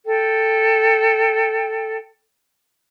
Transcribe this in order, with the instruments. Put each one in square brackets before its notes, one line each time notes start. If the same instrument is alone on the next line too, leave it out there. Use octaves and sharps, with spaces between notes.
[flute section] A4 G5